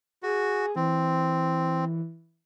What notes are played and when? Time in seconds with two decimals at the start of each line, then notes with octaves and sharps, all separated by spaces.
0.23 F#4 G#4
0.76 E3 C4